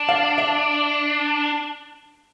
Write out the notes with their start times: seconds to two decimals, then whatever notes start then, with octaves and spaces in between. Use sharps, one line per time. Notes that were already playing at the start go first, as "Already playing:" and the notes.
Already playing: D4
0.09 F5
0.38 E5